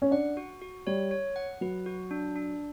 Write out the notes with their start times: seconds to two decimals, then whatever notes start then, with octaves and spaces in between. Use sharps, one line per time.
0.02 C#4
0.11 D4 F#5
0.37 F#4
0.62 F#4
0.87 G3 C#5
1.11 C#5
1.36 F#5
1.61 F#3 B4
1.86 F#4
2.11 D4
2.36 D4